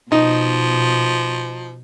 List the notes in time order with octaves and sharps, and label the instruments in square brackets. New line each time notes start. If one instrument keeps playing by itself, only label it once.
[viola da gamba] B2 [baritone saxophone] F3 [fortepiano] D#4